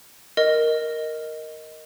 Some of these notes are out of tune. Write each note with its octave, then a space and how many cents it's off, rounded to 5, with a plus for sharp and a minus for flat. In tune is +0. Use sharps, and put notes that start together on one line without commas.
A#4 +0 D#5 +0